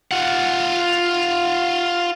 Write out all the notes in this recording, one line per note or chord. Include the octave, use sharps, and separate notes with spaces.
F4 F#5